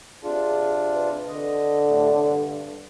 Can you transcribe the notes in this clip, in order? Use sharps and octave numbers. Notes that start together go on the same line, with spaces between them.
C3 D4 F4 G#4
B4
D3 D#5
A2 C3 A3
G2